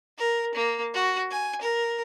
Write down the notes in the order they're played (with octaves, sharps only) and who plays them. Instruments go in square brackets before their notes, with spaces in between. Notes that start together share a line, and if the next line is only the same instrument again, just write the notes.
[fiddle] A#4
A#3
F#4
G#5
A#4